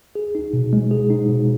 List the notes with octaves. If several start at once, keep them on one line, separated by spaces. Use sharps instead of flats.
G#4
D#4
B2
G#3
G#4
D#4
B2